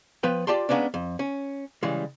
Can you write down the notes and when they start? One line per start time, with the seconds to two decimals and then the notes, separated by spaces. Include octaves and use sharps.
0.23 F3 B3 B4 G5
0.47 F4 G4 D5 G5 A5 C6
0.69 G#3 A#3 B3 C#4 D4
0.94 F2
1.19 C#4
1.83 C#3 E3 G3 G#3